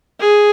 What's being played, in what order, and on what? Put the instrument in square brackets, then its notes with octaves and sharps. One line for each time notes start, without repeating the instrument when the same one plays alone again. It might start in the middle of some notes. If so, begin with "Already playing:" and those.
[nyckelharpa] G#4